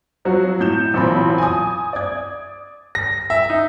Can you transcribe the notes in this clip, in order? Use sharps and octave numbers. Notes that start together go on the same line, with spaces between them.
F3 F#3 F#4
A2 G6 E7
B1 A#2 E3 C4 A5 B5
G#5 D#6
D5 G#6
A#6
E5
D#4